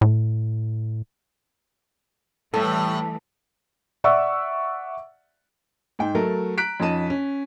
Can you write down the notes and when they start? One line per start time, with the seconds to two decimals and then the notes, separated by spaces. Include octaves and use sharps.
0.01 A2
2.54 A2 E3 G3 A3 A4
4.04 D5 E5 F#5 C#6 E6
5.99 G#2 G5
6.15 F#3 A3 A4 A#4
6.58 A#5 F#6 B6 D7
6.80 F2 C#4 D#4 D#5 A5 D#7
7.10 C#4